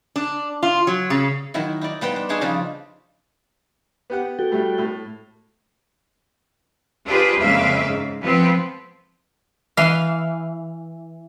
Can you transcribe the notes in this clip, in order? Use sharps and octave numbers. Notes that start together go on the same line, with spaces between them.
D4
F4
F#3
C#3
D#3 F#3 E4
D#4 E4 D5
G3 B3 C5 G5
D4
D4 D#4 G#4 C#5 E5 C6
C#3 F3 G3 D4
B3 G4 F#5
F#4 A4 G5
A2 G3 A3
A2
D4 F4 G4 G#4 B4 C5
F2 C#3 G#3 A#3 E5 F5
G#2
F3 B3 C4
E3 F5